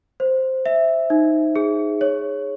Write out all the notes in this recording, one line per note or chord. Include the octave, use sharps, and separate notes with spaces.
C5
E5
D#4
G#4
C#5